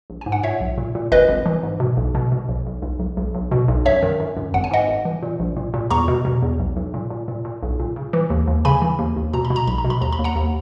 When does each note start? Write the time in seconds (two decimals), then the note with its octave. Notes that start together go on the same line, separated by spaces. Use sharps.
0.10 A#1
0.21 G#2 G#5
0.32 F#5
0.43 A#2 C#5 E5
0.60 B1
0.78 A#2
0.95 A#2
1.12 G#1 B4 D#5
1.29 G#1
1.46 E3
1.63 G#2
1.80 B2
1.97 B1
2.15 B2
2.32 B2
2.49 B1
2.66 B1
2.82 B1
2.99 B1
3.17 B1
3.34 B1
3.52 B2
3.68 B1
3.86 F#2 C#5 E5
4.03 D#3
4.20 F#2
4.37 F#2
4.54 G#1 F#5
4.64 G#5
4.71 G#2 D#5 F#5
4.88 G#1
5.05 E3
5.23 A#2
5.40 A#1
5.57 A#2
5.74 A#2
5.91 E2 A#5 C#6
6.08 B2
6.25 B2
6.42 E2
6.59 B1
6.76 B1
6.94 A#2
7.10 A#2
7.28 A#2
7.45 A#2
7.63 B1
7.80 A#2
7.96 C#3
8.13 E3
8.30 D#2
8.47 D#2
8.65 C#3 G#5 B5
8.82 E3
8.99 D#2
9.17 D#2
9.33 B2 A#5
9.45 B5
9.50 B2
9.56 A#5
9.67 B1 B5
9.78 A#5
9.85 B2
9.90 B5
10.01 D#2 A#5
10.13 B5
10.19 D#2
10.24 F#5 A#5
10.36 D#2